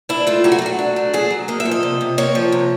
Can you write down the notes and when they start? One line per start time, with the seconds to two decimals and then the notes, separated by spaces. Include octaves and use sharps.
0.09 D4 E4
0.27 A3 F4
0.44 F#3 G4
0.52 F#4
0.58 F4
0.62 F#3 F#4
0.79 D4
0.96 A3
1.14 F#3 G#4
1.30 F#3
1.48 A#3 D#5
1.60 E5
1.66 F3
1.71 D#5
1.83 C3
2.01 C3
2.18 A#3 C#5
2.35 F3
2.52 C3